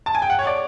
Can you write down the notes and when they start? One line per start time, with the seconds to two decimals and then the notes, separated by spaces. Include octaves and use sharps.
0.06 A5
0.15 G#5
0.22 G5
0.30 F#5
0.39 C#5
0.47 D5